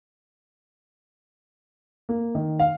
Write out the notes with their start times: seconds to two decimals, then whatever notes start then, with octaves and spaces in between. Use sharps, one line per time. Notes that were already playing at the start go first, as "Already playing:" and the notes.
2.09 A#3
2.35 D#3
2.59 F5